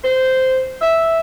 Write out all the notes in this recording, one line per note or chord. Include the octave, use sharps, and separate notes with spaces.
C5
E5